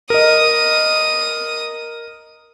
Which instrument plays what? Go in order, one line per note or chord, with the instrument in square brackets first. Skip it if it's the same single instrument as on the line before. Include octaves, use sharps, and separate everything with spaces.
[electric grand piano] A#4 D#5 [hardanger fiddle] D#6